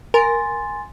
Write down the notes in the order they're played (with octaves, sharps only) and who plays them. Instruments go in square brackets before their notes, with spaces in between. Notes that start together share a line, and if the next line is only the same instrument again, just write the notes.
[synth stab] A#4 [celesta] G#5 C6 A6